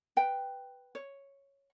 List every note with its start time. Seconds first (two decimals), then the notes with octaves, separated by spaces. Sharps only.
0.17 B4 G5
0.95 C#5